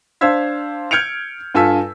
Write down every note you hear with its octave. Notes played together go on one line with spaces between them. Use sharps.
D4 C5 F5 E6 G#6 B6
F6 G6 G#6 C#7 D7 F7
G2 F4 A4 G#5 E6 B6